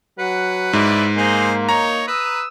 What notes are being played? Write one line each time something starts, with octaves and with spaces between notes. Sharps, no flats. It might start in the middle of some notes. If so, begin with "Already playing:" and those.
F#3 B4 F#5
G#2 E4 D5
A#3 D#4 G#4 C5 D#5
D#4 C#5 A#5
B4 D#6 E6